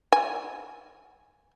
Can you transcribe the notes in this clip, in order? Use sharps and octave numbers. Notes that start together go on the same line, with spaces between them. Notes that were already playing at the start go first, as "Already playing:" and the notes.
G#5